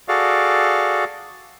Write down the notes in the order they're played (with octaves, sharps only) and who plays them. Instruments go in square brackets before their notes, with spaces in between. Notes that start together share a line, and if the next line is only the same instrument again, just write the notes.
[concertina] F#4 G#4 A4 D5 F5